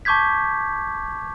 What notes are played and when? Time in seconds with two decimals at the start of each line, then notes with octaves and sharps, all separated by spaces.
0.05 A5 C#6 D6 G6 G#6 B6